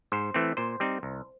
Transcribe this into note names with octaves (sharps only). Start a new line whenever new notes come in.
G#2 C5
E3 A3 C4
A#2 C5
G3 C4 D#4
C2